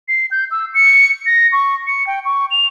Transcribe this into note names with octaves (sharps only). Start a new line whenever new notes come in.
C7
G6
E6
C#7
A#6
C#6
C#7
G5
C#6
F7